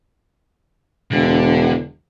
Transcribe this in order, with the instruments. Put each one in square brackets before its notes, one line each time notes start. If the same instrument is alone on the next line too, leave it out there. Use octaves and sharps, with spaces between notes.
[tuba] E1 [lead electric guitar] D3